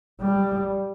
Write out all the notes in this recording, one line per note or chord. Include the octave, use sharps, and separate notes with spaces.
G3